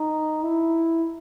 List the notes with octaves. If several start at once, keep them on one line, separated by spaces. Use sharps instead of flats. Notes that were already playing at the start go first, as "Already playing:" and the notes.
Already playing: D#4
E4